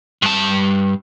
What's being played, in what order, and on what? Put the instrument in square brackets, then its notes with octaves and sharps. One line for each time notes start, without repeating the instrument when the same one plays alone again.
[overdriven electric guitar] G2 A5